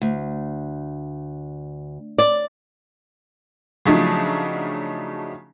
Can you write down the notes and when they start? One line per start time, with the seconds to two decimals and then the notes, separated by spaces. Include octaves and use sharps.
0.02 D2
2.18 D5
3.86 C#3 F3 F#3 A3 D4 D#4